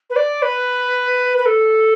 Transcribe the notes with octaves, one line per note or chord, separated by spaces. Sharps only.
B4
D5
B4
B4
A4